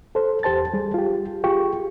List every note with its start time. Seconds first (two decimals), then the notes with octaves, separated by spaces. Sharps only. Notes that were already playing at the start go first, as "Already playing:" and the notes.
0.15 A4 C5
0.43 E2 G4 C5 A5 A6
0.74 G3 G#4
0.94 F4 G4
1.44 F4 G4 G#4 G5 C#6